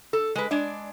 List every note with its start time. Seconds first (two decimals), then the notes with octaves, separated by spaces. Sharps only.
0.13 A4
0.36 G#3 B4
0.51 G#3 D4 D5